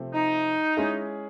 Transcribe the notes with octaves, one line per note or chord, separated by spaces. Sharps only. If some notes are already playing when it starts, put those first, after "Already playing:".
Already playing: C3 F3 A3 C4
D#4
G#3 C#4 E4 G#4